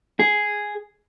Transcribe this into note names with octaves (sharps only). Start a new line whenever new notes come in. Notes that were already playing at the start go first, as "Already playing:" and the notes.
G#4